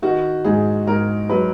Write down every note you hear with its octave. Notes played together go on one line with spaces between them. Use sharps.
D#3 F#4
G#2 G#4
G#2 A#4
F#3 B4